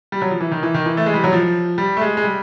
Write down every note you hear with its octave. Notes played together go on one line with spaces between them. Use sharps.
G3
F#3
F3
E3
D#3
E3
D#3
E3
A3
G#3
G3
F#3
F3
G3
A3
G#3
G#3
G3